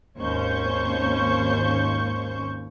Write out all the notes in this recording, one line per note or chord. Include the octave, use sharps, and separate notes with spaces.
G#1 D#2 C#4 C5 C#6 G6